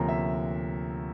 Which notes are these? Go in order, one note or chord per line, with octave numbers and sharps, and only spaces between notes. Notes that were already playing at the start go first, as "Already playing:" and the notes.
Already playing: D2 C3 F3 A#3 C#4 A#5
E5